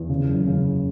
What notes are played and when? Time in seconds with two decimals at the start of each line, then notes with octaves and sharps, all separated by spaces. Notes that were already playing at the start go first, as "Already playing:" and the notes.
Already playing: E2
0.09 C#3
0.28 F#1
0.47 C#3